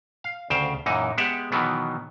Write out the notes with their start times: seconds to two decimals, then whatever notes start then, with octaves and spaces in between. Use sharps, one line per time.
0.24 F5
0.50 D2 C#3 C5 F5 G5
0.86 F#2 A#2 E3 D#4
1.18 G#3 B3 G4 E5 F#5
1.52 B2 D#3 E3 F#3 B3